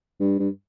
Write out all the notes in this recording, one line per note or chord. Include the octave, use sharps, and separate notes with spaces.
G2
G2